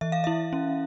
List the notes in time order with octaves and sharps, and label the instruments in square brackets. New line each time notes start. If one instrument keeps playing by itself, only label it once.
[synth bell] E3 E5
F5
E4 E5
C#4